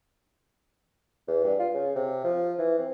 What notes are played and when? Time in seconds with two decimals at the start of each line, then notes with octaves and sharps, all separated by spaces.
1.27 E2
1.44 G2
1.59 F4
1.74 C#3
1.95 C3
2.24 F3
2.58 E3
2.78 C4